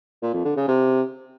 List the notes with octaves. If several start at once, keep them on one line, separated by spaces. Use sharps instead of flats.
A#2
F2
D3
C#3
C3